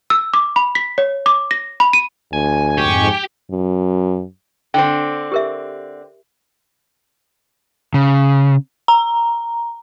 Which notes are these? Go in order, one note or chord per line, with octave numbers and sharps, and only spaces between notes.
E6
D6
B5
B6
C#5
D6
A#6
B5
D#7
D2 G#5
F2 G#2 G4 C#6
F#2
D3 C4 G5
G4 A#4 E5
C#3
A#5